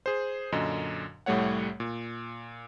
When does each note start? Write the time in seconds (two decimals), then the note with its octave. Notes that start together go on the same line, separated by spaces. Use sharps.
0.06 G#4 C5
0.52 F#2 A#2 D3 D#5
1.26 C2 A2 G3 A3 C#5 F#5
1.80 A#2